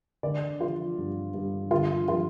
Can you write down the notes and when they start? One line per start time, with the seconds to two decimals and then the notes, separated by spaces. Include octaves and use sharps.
0.23 D3 D5
0.60 F3 F4
0.98 G2
1.34 G2
1.71 D3 F4
2.08 F3 F4